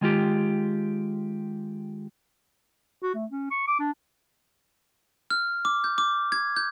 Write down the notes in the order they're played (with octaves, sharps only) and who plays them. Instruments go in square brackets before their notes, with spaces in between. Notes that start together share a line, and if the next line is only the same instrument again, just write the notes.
[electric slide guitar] D#3 G#3 F4 G4
[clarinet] F#4
A3
C#4
C#6
D6
D4
[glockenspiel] F6
D6
G6
D6
G#6
G6